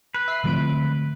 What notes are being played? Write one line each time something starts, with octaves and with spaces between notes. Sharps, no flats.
B4
E5 B6 C7
G#2 D3 F3 A3 C4 D7